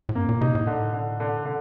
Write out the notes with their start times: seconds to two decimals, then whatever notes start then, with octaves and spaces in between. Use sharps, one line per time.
0.09 A2
0.15 G2 A#3
0.29 A#2
0.41 C3 D#4
0.55 A2
0.67 D3
0.93 D3
1.20 D3
1.46 D3